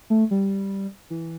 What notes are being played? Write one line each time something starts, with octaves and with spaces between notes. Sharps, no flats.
A3
G3
E3